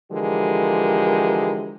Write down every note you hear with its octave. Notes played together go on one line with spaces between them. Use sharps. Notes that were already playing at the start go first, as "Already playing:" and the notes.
D3 E3 F3 G#3 G4 A#4